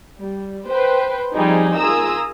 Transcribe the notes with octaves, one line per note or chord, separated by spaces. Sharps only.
G3
B4 C5 G5
F3 G3 C4 D#4 G#4
F4 G#4 A#4 A#5 D#6 E6